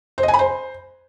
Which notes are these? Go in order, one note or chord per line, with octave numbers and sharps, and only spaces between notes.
C5
D#5
G#5
B5
C5